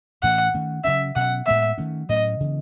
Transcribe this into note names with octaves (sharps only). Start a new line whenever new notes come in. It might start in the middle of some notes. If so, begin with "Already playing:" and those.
A2 E3 A3 C#4 F#5
D#3 A3 C#4
C#3 F#3 C#4 E5
B2 F#3 C#4 F#5
A2 G#3 B3 E5
D#3 A3 C#4
A2 F#3 A3 C#4 D#5
C#3 E3 B3